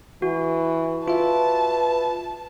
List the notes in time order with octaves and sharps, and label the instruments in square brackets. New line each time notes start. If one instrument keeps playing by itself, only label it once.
[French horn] E3 [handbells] F#4
[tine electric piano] F4 E5 [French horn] B4 [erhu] A5